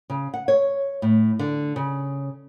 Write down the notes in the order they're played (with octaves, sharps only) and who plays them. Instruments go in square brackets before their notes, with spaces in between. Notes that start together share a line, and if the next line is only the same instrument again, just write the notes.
[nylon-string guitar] C#3
F#5
C#5
A2
D3
C#3